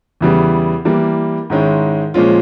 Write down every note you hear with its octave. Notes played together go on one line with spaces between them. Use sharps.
E2 C#3 E3 G3 B3
E3 G3 A#3
G#2 D#3 G#3 C#4 E4
A#2 F3 G#3 C#4 F4